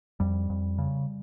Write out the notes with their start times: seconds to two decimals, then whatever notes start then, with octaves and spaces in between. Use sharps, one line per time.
0.20 F2 G3
0.50 F2
0.78 C#3